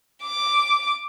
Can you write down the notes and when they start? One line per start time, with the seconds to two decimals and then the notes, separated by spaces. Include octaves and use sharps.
0.23 D6